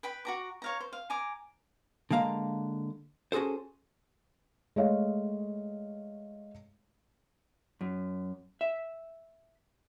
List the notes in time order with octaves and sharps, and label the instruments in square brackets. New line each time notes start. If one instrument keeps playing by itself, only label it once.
[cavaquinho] B4 G5 B5
F#4 A#5 D6
C#5 F5 A#5
C5
F5
G#5 A#5 D6
[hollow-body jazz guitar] D3 G#3 A#3 F5 A#5
C#4 F#4 G#4 A4 C5
[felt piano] G#3 A3 C#5 D#5 F5
[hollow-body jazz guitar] F#2
E5